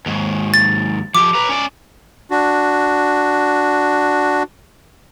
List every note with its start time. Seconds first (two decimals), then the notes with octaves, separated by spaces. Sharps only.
0.06 D#2 G#2
0.54 A6
1.15 F3 G4 D6
1.35 B4 A#5
1.49 C#4 D5
2.31 D4 F#4